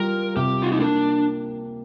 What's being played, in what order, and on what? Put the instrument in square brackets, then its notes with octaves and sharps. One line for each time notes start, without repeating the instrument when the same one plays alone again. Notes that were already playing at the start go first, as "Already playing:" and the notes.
Already playing: [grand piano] G3 F4 [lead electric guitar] A#4
[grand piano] C3 [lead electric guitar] G4
[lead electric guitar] F4
D#4
[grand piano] A#3 [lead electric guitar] D4